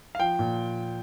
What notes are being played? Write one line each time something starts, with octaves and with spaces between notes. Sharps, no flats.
F5
F3 G5
A#2